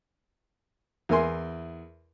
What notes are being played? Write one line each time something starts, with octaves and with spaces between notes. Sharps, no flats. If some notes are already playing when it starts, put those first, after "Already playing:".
E2 E4 A#4 G#5 C6